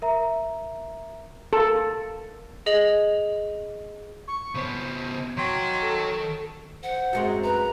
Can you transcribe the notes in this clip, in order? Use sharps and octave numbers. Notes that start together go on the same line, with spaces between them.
A#4 E5 A#5
A4 A#4 F5
G#4 D#5 F#7
C#6
C#3 B3 C5
D#3 F#3 G5 C6
A4
C5 F#5
F#2 G#3 C4
B4 A#5